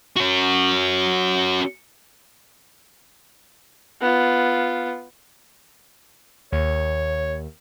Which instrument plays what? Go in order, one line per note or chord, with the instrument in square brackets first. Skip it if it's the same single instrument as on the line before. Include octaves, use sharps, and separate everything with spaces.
[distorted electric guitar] C#4 F#4
[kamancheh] B3 F4
[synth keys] D#2 [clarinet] C#5